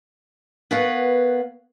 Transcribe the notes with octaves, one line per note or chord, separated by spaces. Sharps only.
B3 A#4 B4 C#5 F5 F#5